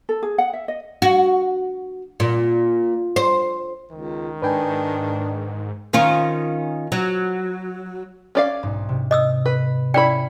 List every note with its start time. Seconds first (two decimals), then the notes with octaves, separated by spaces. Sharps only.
0.09 A4
0.23 G#4
0.38 F#5
0.53 E5
0.68 D#5
1.02 F#4
2.20 A#2
3.16 C5
3.92 C#2 D#3
4.42 G#2 D4 B4 G5 G#5
5.93 D#3 C#4 F4
6.92 F#3
8.35 C#4 D5 F5 D6 F6
8.63 B1 G#2
8.89 C3
9.11 D#5 D#6 E6
9.46 B4
9.94 C#4 E4 D5 G5 B5